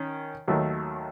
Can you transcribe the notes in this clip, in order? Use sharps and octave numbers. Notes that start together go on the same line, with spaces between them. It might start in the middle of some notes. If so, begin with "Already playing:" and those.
Already playing: D#3 C#4
D#2 D#3 F#3 A3